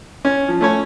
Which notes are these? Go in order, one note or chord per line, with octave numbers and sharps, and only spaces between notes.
C#4
F3
A3 C#4 C#5